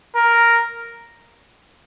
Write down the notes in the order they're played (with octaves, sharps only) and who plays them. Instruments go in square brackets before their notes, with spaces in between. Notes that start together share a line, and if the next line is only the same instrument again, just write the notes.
[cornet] A#4